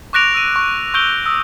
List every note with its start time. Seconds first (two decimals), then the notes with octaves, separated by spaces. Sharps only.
0.13 C#6 D6 F#6 A#6 D7 F7
0.34 E6 D#7
0.56 C#6
0.94 C#6 E6 G6 D7 F7 G7
1.26 D#6 E6